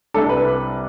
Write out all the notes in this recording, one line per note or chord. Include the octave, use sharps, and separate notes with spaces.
C2 C3 G3 D4 A4
B4